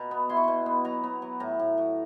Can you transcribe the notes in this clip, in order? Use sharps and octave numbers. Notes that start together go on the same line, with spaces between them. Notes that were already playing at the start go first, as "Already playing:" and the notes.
Already playing: B2 A#5
B3
E4 C6
C#6
B2 C6
B3
F#3 A#5
B3
F#3
A2 A#5
A2
F#3